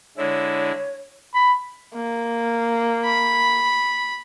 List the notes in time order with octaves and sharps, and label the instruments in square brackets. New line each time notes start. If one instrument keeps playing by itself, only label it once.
[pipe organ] D3 G#3 E4 [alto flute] C#5
[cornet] B5
[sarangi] A#3
[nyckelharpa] B5